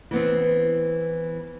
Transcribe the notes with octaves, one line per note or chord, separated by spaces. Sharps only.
E3 B3 C4